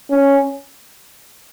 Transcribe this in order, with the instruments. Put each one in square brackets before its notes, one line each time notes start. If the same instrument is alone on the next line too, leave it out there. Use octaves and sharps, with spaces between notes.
[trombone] C#4